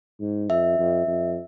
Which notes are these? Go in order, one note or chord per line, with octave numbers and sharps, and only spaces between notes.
G#2
F2 E5
F2
F2